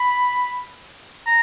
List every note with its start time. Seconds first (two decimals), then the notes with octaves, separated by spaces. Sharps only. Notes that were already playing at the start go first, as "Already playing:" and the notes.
Already playing: B5
1.27 A#5